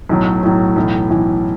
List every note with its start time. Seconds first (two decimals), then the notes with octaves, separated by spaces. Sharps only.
0.09 B1 A2 F#3
0.43 B1 A2 F#3
0.76 B1 A2 E3
1.10 B1 A2 E3